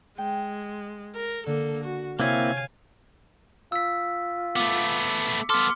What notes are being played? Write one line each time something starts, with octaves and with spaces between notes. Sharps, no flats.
G#3 G5
A#4
D3 A#3 A4
F#4
C3 A#3 C4 E4 C#5 F5 G#5
F4 E6 B6
A3 B3 D6
B3 A4 C6 D6 F6